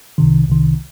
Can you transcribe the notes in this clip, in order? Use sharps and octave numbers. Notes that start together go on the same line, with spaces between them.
C2 C3 D#3
C2 C3 D#3